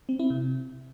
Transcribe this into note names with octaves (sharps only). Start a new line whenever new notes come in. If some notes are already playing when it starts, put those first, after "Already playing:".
C4
E4
C3